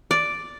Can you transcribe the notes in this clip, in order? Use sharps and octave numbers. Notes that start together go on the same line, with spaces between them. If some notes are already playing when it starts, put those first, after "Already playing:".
D5